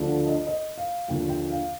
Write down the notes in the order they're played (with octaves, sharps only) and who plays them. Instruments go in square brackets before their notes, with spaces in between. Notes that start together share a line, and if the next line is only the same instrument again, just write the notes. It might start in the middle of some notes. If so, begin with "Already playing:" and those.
Already playing: [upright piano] D2 D3 F3
D#5
D#5
F5
D#2 D3 F3 G5
G5
F5